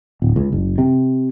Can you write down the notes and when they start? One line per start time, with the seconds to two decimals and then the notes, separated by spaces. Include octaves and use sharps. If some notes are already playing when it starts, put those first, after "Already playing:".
0.22 D1
0.36 C#2
0.52 F#1
0.78 C3